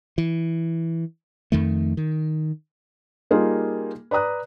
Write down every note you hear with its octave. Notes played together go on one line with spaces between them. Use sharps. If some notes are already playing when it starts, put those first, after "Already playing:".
E3
F2 D#3 A3
D#3
G3 A#3 D#4 F4 G#4
B4 D5 A#5 D#6 F#6